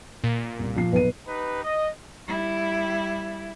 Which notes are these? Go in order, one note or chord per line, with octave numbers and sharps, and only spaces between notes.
A#2
C2
F3 C7
B1 B4 D#7
D#4 G4 B4
D#5
G3 E4